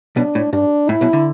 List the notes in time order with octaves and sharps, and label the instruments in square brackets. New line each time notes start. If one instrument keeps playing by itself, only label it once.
[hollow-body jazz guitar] B1 B2 [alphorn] D4
[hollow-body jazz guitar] A2
[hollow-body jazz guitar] G2 [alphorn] D4
[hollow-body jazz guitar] A2 [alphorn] E4
[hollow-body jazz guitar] B1 B2
D3